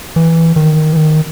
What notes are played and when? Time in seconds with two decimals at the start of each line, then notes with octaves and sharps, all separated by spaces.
0.16 E3
0.56 D#3
0.93 E3
0.97 D#3